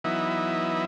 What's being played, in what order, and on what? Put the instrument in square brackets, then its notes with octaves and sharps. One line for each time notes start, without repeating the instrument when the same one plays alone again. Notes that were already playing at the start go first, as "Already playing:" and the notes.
[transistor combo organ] E3 F#3 B3 D#4 E4